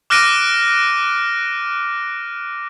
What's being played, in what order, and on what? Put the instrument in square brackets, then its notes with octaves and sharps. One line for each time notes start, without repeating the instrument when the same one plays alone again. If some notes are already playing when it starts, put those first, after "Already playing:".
[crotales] D6 F6 F#6 A#6 D7 D#7